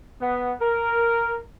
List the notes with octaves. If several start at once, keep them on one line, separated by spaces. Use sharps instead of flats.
B3
A#4